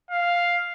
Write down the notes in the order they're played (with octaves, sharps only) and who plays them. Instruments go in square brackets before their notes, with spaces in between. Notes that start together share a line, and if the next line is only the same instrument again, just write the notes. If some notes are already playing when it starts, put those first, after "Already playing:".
[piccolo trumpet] F5